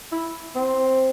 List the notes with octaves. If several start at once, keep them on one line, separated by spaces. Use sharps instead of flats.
E4
C4